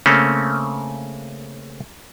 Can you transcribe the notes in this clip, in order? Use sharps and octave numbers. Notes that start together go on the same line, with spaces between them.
C#3 A3 A#3 C4 C#4